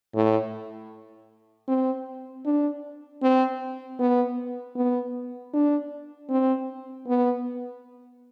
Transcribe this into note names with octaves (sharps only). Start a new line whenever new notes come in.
A2
C4
D4
C4
B3
B3
D4
C4
B3